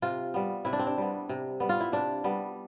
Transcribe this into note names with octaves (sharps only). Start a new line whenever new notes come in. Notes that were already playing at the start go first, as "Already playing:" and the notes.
C3 F4
G3 B3
C3 E4
D4
C4
D4
G3 B3
C3
G3 B3
F4
E4
C3 D4
G3 B3